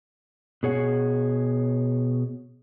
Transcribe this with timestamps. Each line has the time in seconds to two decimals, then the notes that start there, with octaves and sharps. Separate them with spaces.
0.63 B2 G#4 C#5 F#5